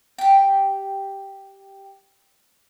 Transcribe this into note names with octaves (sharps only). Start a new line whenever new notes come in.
G4 G5